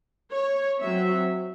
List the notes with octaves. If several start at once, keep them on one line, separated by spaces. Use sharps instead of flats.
C#5
F#3 C4 E5